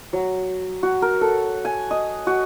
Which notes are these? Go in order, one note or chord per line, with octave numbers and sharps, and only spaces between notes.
F#3
F#4
A#4
A4
G#5
D#5
F#4